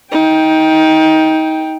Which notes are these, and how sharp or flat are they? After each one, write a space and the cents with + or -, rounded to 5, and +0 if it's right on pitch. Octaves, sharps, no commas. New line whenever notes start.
D#4 +25 G5 +5